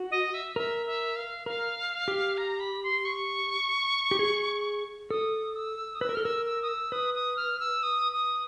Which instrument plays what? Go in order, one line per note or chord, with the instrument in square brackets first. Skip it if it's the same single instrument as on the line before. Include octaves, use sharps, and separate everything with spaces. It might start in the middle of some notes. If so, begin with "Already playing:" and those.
Already playing: [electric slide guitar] F#4
[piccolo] D#5
E5
[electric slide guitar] A#4 [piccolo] E5
[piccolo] E5
F5
[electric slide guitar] A#4 [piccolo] F5
[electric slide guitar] G4
[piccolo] A#5
B5
C6
C#6
[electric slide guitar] G4
G#4
[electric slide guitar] A4 [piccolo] D#6
[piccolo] E6
D#6
[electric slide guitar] B4 [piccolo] E6
[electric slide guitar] A#4
[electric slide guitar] A4 [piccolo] F6
[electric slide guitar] A#4 [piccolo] E6
[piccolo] E6
D#6
E6
[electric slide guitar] B4 [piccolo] D#6
[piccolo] D#6
F6
E6
D#6
D#6